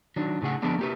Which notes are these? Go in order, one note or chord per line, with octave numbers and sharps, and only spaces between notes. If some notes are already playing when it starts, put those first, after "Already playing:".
D#3 F#3 D4
A2 C#3 G#4 F#5
D3 F3 G#3 B3 D4
A#3 G4 B4